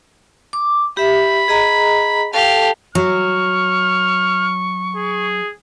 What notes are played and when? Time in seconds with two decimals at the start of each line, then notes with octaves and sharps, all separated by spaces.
0.53 D6
0.97 G4 E5 B5
1.48 G#4 D#5 A#5
2.33 G4 A4 F5 A5
2.95 F#3 C#6 F6
4.97 G#4